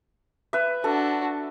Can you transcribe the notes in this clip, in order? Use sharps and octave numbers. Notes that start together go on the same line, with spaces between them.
B4 E5
D4 F#4 A4